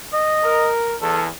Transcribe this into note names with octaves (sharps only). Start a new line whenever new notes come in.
D#5
A#4
E2 A4